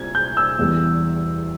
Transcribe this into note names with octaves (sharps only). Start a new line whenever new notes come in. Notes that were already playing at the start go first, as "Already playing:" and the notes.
Already playing: C2 A#2 G#6
G6
E6
E2 E3 G3